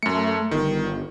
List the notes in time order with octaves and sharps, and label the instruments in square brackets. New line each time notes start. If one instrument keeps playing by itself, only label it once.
[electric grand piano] F#2 C#7 [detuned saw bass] A3
[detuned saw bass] G1 [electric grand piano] D#3